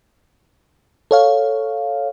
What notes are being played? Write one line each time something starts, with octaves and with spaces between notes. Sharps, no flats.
A4 C#5 F5